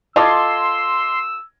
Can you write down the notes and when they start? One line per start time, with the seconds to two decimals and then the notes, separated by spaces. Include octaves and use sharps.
0.16 F4 A4 D#5 C6 D6 E6 G#6